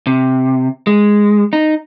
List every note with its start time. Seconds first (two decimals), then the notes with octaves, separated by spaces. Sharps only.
0.07 C3
0.87 G#3
1.53 D#4